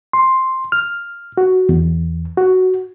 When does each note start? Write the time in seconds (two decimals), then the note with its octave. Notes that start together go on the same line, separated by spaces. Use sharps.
0.13 C6
0.72 F6
1.38 F#4
1.69 E2
2.37 F#4